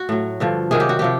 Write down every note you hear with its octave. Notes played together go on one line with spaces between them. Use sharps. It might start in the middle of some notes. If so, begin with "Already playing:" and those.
Already playing: F#4
A2 F#3
G2 D3 F3
C3 D#3 F#3 G#4
G4
F#4
C3 F3 G4